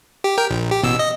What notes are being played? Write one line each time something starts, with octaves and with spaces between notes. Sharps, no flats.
G4
A#4 G5
A#1
G4
A1 B2 E6
D#5